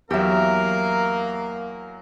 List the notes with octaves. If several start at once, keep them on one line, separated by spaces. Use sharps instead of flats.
E2 F#3 A#3 G4 A#4 E5